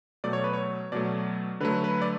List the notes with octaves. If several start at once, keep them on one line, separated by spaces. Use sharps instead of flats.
B2 F#3 A3 D5
C#5
B4
C#5
B2 F#3 A3 D5
D3 F#3 A3 B4
B4
D5